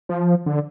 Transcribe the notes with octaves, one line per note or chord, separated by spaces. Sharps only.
F3
D3